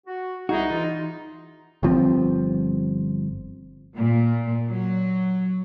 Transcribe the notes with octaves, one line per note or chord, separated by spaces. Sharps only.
F#4
C2 D#4 E4 F#4 G#4
E3 F4
G1 F3 C4
A#2
F#3